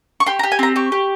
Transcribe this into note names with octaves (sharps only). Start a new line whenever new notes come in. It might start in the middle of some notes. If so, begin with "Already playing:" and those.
C#6
G4 C6
A#5
G4
G#5
C4 A#5
G4 C#6
G4